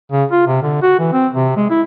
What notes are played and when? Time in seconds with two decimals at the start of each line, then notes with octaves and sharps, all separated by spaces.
0.12 C#3
0.32 F4
0.47 C3
0.62 D3
0.82 F#4
0.99 E3
1.13 C4
1.34 C3
1.56 G#3
1.70 E4